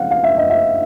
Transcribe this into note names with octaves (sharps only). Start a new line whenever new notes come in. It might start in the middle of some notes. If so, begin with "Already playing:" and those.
Already playing: C#3 F3 G#3 C4 F5 F#5
F5
E5
D#5
E5